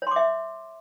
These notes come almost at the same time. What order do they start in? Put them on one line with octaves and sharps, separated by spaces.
C#5 C6 D6 E5